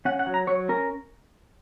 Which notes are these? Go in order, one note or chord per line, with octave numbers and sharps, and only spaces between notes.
C#4 F#5
F#5
F#3
A#5
F#3 C#5
C#4 A#4